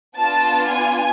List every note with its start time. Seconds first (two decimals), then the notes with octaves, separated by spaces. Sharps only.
0.18 B3 D4 F4 A5
0.70 G#5